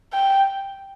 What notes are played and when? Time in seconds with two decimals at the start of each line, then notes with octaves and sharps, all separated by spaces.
0.13 G5